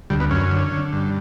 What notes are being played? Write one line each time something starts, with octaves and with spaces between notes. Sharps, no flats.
D2 G3
B3
F#2 C#4
D3
D3
G2